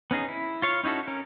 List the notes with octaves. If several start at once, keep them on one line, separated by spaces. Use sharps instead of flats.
B3 C#4 D#4 G#4
E4
F4 C#5 F5
C#4 D#4 E4 F#4 A4
C#4 A#4